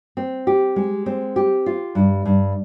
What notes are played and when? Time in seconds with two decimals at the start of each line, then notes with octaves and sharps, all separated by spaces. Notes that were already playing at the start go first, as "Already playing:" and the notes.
0.17 C4
0.47 G4
0.76 G#3
1.06 C4
1.36 G4
1.66 F4
1.95 G2
2.25 G2